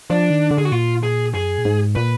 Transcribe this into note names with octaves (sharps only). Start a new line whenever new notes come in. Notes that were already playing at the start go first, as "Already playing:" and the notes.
F3 D4
D#3
D3
G#4
F#4
A#2 F4
G#4
F#2 G#4
A#2
G#2
A#2 B4